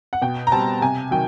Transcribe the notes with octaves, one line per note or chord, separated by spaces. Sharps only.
F#5
B2 G5
A#5
G3 C4 A5
C3 G#5
D#3 F#3 G5